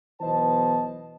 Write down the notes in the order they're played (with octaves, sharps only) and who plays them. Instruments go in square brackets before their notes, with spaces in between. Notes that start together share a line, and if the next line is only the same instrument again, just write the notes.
[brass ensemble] B1 E3 B3 C5 D#5 A5